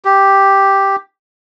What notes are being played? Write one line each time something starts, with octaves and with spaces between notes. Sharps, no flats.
G4